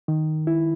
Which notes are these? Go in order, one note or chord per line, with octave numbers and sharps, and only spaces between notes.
D#3
E4